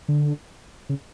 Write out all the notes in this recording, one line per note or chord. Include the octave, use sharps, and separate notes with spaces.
D3
C#3